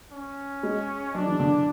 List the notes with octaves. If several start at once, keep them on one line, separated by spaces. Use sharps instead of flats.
C#4
G#3
F#3 D4
E3
D3